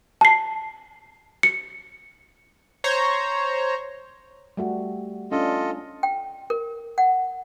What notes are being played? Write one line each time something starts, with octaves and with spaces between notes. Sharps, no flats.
A5 C7
C#7
C5 C#5 A#5
G3 A3 F#4
C#4 D4 F4 A4 D#5
G5
A#4
F#5